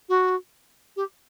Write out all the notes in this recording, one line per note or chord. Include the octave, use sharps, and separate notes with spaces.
F#4
G4